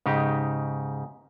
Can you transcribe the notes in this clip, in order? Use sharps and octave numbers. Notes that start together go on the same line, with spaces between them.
G#2 C#3 D#4 G4